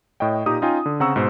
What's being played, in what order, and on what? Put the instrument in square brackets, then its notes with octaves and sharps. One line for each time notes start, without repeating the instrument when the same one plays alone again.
[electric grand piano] A2 C#5 D#5 G5
A#2 D#4 G4 A#5 D#6
C#4 D#4 F4 G5 G#5
D3
C#3 C4 F#5 A#5 C#6 E6
G#2 B2 C5